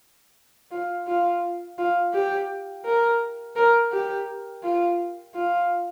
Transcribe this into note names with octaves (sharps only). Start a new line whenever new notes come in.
F4
F4
F4
G4
A#4
A#4
G4
F4
F4